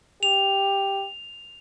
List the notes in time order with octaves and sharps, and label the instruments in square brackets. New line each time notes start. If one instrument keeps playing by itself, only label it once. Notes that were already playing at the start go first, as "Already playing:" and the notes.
[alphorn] G4 [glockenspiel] F7